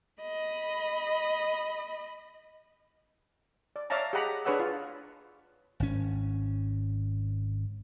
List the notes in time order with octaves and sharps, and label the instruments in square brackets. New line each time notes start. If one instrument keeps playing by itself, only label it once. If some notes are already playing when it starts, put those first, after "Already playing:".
[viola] D#5 B5
[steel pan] D5
C#5 D5 E5 F5 A5 A#5
G4 G#4 D#5 F#5 A#5 B5
D4 G#4 B4 C#5 F#5 E6
F4
[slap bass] G#1 C#4